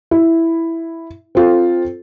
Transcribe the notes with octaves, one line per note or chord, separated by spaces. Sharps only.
E4
C4 F4 A4